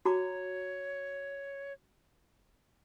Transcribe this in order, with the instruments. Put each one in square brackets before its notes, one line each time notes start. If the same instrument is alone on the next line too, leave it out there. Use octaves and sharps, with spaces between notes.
[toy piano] F#4 A#5 D6 [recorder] C#5